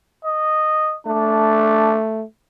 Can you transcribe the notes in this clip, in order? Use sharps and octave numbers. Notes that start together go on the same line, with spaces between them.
D#5
A3 D4